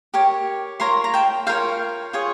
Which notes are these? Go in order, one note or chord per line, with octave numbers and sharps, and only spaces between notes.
G4 A#4 C#5
F4 A#4 C#5 A#5 C6
A#5
G5 A5
F4 A#4 C#5 F5 G5
F4 G#4 C#5